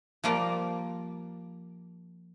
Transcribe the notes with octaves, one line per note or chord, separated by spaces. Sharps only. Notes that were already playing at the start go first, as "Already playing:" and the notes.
F3 G3 A#3 F4 D5